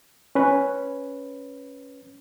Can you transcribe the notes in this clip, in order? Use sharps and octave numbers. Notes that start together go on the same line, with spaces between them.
C#4 B4